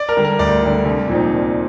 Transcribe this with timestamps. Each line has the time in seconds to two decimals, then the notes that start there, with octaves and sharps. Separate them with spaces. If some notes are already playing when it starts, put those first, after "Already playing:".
Already playing: D5
0.09 A#4
0.17 D3 G3 D4
0.25 A#4
0.39 D2 D5
0.63 D3 G3 D4
0.85 C2
1.08 A#2 F3 C4 D#4
1.31 C2